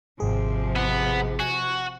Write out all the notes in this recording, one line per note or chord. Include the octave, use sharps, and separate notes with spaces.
G#1 C3 F3 G#4
B3
F#4 G#5